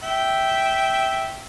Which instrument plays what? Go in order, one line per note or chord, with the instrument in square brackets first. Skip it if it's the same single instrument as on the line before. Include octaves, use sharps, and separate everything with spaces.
[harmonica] E5 G5